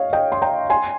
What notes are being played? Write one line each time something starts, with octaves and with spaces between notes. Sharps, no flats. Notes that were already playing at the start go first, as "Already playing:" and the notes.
Already playing: C#5 D#5 F5
D#5 G5
C6
G5 A#5
G#5 C6